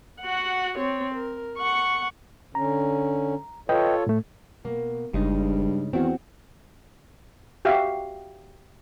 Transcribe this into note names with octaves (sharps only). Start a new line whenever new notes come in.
F#4 F#5
C4 C#5
A#4
F#5 C#6
D3 C#4 A#5
F4 A4 B4 C#5 D#5 G5
A2 A3
B2 A#3
F#1 G2 C#3 G#3 D#4
E2 D#3 C4 F#4
F#4 G4 E5 F5